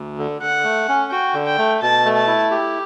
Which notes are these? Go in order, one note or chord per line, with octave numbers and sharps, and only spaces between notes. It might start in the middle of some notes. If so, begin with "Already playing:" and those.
Already playing: D2
D3
D3 F#5
A3
C#4
F#4 G5
D3
G5
A3
B2 A5
A3
A5
E4
G4